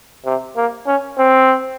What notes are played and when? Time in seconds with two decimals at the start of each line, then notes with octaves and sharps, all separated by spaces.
0.25 C3
0.57 A#3
0.87 C#4
1.18 C4